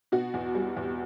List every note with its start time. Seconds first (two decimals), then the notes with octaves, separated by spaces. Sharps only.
0.12 B2 F#4
0.34 E2
0.55 G3
0.76 E2